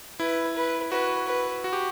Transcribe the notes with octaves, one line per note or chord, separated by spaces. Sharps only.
E4 B4
B4
F#4 B4
B4
F#4
G4